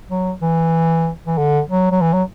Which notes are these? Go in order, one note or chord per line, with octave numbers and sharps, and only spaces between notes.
F#3
E3
E3
D3
F#3
F#3
E3
F#3